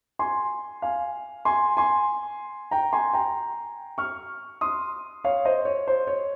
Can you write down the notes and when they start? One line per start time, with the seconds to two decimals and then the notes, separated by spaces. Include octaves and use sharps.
0.19 G#5 C6
0.82 F5 G#5
1.45 G#5 C6
1.77 G#5 C6
2.71 G5 A#5
2.93 G#5 C6
3.13 G5 A#5
3.98 C#6 F6
4.61 C6 D#6
5.24 C#5 F5
5.45 C5 D#5
5.65 C#5
5.88 C5
6.07 C#5